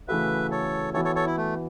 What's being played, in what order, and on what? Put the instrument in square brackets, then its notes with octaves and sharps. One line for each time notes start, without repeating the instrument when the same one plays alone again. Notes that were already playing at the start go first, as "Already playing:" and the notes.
[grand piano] C#3 E3 A3 F#4 [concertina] B4 E5
[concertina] A4 C#5
[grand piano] E3 B3 F#4 [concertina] A4 C#5
[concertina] A4 C#5
A4 C#5
E4
A3